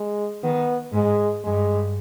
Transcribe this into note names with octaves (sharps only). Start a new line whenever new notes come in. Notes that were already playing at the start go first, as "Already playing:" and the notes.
Already playing: G#3
D#3 B3
G#2 G#3
G2 G#3